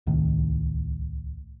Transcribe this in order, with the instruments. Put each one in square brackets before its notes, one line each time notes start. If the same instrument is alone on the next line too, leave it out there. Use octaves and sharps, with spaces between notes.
[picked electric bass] D1 C2 A2 D#3